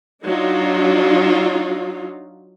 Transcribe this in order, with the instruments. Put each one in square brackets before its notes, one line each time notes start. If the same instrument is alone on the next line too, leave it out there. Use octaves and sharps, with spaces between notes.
[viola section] F#3 D4 D#4 F4